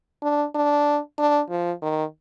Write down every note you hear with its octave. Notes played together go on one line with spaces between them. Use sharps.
D4
D4
D4
F3
D#3